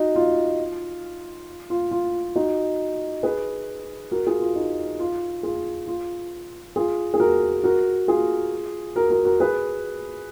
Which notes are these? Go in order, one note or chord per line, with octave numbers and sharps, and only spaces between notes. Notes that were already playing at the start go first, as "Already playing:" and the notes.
Already playing: D#4 F#4
F4
F4
F4
D#4 F#4
G#4 B4
F#4 A#4
F4 G#4
F4
D#4
F4
F4 G#4
F4
F4 G#4
G#4
F#4 A#4
F#4 A#4
F4 G#4
F#4 A#4
F#4 A#4
F#4 A#4
G#4 B4